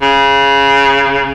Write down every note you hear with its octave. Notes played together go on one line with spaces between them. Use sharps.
C#3